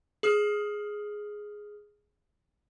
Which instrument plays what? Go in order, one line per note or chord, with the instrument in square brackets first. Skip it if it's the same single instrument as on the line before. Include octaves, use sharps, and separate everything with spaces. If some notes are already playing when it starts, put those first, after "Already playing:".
[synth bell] G#4 D#6 F6